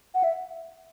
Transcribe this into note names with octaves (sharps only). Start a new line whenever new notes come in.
F#5
E5